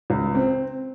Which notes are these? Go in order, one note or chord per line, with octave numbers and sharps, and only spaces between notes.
C#2
C4